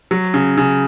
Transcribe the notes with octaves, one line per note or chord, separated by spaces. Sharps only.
F#3
C#3
C#3